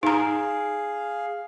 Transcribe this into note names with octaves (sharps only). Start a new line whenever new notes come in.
D#4 G#4 F5 A#5